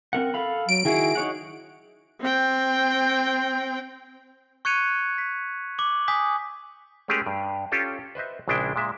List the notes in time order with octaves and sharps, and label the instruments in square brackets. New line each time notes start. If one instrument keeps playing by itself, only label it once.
[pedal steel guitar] C4 A#4 F#5
A4 F5 B5
[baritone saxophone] F#3 [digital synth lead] D7
[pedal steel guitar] D#3 E4 F#4 [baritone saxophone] G#4
[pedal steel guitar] D#4 C#5 F#5
[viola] C4 G5
[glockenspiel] C#6 F#6 G#6 C#7 D#7 F7
B6
D6 F#7
G#5 D#6 G6 B6
[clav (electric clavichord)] G#3 A3 C#4 G4 G#4 A#4
G2
C#4 F4 G4 A4
B4 C5 D#5 E5
A#1 C#3 G#3 D4 E4 G5
A#2 G#3 E5